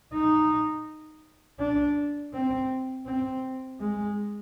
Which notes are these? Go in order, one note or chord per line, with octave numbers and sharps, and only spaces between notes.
D#4
D4
C4
C4
G#3